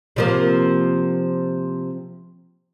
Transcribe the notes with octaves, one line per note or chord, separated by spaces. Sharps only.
C3 F3 A#3